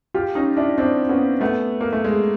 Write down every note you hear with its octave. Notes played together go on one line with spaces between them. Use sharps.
F4 G4
C#4 D#4
D4 E4
C4 D4
B3 C#4
A3 B3
A#3
A3
G#3